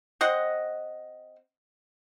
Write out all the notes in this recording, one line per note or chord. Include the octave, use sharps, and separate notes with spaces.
C4 D#5 F#5